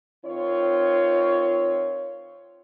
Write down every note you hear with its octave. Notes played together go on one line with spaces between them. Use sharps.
D#3 C4 F4 C#5